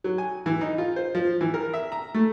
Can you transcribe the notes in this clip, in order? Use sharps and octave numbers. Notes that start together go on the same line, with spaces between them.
F#3
G#5
E3
D#4
F4
C5
F3
E3
A#4
E5
A#5
A3